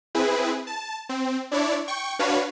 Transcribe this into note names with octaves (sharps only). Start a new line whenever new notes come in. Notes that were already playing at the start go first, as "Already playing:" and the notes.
C4 E4 G#4 B4
A5
C4
D4 E4 C#5 D5
G5 C#6
D4 F#4 B4 C#5 F5